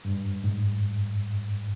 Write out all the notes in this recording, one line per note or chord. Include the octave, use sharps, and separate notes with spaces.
G2
G#2